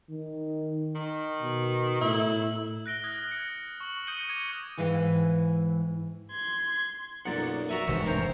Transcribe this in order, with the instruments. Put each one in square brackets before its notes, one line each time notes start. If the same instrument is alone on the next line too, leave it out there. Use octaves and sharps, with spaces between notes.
[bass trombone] D#3
[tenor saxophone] D#3
[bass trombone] B2
[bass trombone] A2 [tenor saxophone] E4
[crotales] F#6 A#6 D7 G7
D#6 F6 F#6 G#6 A#6
A#6 C#7
C#6 F#7
D#6 G6 C#7 D#7 G7
D6 G#6 C#7
[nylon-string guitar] G#2 E3 E4 B4 F5 G5
[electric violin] C6 G#6
[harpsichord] B1 F#2 A#2 [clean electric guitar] D5 F#5
[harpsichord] F#4 A#4 G#5 [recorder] E5
[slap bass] C2 C3 E3 [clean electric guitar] G#2 D#3 [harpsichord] C5 C#5
[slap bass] F1 D#3 [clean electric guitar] G2 [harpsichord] A#4 C#5 [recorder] C5